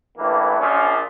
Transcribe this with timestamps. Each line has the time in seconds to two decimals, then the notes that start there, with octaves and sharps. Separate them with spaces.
0.18 A1 G2 E3 A#3
0.59 A#1 A#2 F3 C#4